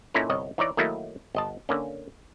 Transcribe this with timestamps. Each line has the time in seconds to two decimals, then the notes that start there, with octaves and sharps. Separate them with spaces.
0.14 A#2 C#4 D#4 E4 A4 A#4
0.29 G1 C2 C#5 D#5
0.58 E3 D#4 C#5 D5
0.77 D#3 F#3 A3 A#3 D#4 E4
1.35 G1 D#5 A5
1.69 D3 A#3 C#4